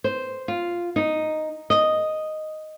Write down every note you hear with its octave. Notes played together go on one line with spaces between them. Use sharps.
C5
F4
D#4
D#5